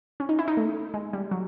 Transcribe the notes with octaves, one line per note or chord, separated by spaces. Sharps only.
C#4
D#4
E4
D#4
A3
G#3
G3
F#3